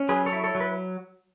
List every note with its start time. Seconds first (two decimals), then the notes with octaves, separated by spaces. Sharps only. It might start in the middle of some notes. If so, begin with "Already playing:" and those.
Already playing: C#4
0.09 F#3 G#4 B4
0.26 A4 C#5
0.33 E4
0.44 A4 C#5
0.55 F#3
0.60 B4